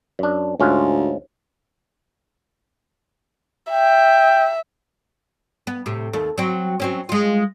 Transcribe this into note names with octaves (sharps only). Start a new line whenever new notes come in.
F#2 D4
D2 G#2 C#4 F4
E5 G5
B3
A2 C3
D#2 A3
F#3 C4
F#3 C4 C#4
G#3 F4